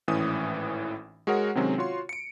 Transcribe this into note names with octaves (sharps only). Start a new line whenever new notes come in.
G#1 A2 E3 C#4 D#6
G#3 F#4 G#4 A#4 C#5 F#5
C3 D#3 F#3 G#3 C4 C#4
F4 F#4 C#5 C6
C#7 D7